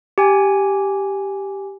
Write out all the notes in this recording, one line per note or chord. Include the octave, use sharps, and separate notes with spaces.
G4 G#5